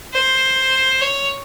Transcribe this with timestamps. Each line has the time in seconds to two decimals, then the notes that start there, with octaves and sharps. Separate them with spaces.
0.14 C5
1.01 C#5